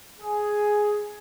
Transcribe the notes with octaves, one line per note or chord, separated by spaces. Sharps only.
G#4